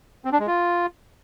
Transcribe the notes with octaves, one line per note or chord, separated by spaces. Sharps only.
C4
D4
G#3
F4